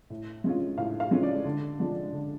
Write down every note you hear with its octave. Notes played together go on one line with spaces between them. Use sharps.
A2
G#3 C#4 F4
A2 F5
F5
G#3 C#4 F4
D5
D3
F3 G#3 D4
D3